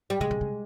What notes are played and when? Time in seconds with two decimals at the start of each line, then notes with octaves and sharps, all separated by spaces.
0.10 G3
0.20 C3 G#3
0.31 C3
0.41 C3